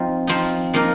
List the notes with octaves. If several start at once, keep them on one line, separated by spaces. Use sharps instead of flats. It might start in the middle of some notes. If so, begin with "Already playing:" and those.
Already playing: F3 C4 D#4
F3 C4 D#4
F3 A#3 D#4 A#4